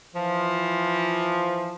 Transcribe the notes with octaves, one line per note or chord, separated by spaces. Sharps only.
E3 F3